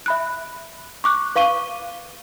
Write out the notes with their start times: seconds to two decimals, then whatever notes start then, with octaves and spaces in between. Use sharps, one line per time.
0.06 E5 B5 F#6
1.04 C#6 D6 F#6
1.36 B4 F5 C#6 D#7 G7